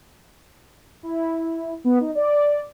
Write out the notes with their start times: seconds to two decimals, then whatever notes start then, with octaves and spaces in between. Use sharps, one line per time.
1.03 E4
1.84 B3
2.00 D#4
2.15 D5